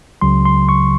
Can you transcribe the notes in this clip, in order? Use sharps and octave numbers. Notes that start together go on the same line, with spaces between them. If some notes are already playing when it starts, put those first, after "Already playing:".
C#2 C#3 F#3 C6
C6
C#6